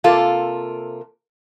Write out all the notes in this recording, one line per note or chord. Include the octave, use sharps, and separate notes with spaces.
C3 A#3 F4 A4